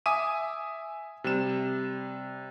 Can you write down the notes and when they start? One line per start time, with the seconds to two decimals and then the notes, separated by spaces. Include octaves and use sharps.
0.06 E5 G#5 D6 D#6 D#7
1.24 C3 G3 E7